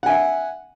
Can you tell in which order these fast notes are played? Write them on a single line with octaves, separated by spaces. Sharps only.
F#5 G#5 E5